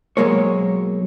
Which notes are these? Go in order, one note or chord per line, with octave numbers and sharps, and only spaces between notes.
B1 F#3 G#3 A#3 C#5